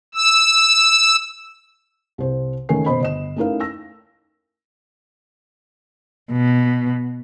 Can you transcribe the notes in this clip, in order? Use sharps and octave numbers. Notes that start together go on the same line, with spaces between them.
E6
C2 C5
D#3 A3 C#4 A#4 G#5 C7
B2 C5 D#5 B5
G1 D#5 E7
A3 C#4 D#4 E4 A#4 F5
E6 A#6
B2